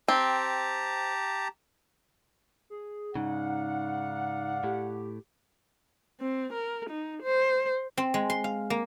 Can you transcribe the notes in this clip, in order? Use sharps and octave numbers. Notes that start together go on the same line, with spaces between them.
C4 G4 A5 A#5
G#4
G#2 C#3 D#4 D5 F5 F#5
A2 G4
C4
A#4
D#4
C5
C4
G#3
C6
F5
A#3